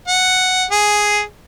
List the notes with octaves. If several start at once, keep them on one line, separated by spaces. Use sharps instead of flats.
F#5
G#4